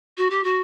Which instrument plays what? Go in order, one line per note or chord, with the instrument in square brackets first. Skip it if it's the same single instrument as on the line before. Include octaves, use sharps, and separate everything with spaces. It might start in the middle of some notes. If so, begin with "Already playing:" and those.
[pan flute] F#4
G4
F#4